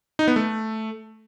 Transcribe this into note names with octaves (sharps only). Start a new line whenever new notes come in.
D#4
B3
A3